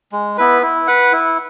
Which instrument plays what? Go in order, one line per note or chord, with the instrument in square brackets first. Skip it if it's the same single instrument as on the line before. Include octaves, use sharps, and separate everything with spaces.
[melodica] G#3
B3 E4 B4
E4
B4 F#5
E4